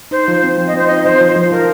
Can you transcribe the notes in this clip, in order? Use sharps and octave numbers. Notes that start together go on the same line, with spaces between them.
D#4 C5
F3
C4
F3
D#5
C4 C5
D#4 D#5
F3 C5
F3
C5
F3
F3 A#4